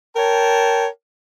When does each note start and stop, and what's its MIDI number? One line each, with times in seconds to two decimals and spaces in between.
0.16 0.87 70
0.16 0.87 73
0.16 0.87 79
0.16 0.87 81